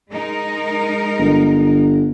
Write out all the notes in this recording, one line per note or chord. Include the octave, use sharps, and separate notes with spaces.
G#3 D#4 A#4
G1